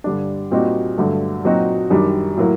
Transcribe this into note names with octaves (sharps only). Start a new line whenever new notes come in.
G2 D3 G3 D4
A#2 G3 C4 D#4 F#4
G2 D3 F#3 A3
A#2 F#3 C4 D#4 F#4
F#2 D#3 G3 D4
A2 F#3 A#3